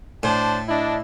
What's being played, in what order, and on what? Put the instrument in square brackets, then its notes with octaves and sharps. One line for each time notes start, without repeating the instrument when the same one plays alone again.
[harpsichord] A2 [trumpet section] D4 C5 [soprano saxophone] D5 [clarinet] A5
[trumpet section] D4 [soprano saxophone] E4 [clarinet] D#5